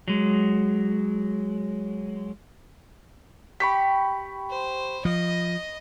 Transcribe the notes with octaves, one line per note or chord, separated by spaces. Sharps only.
F#3 G#3
G4 B5 C#6 B6
C5
F3 D#5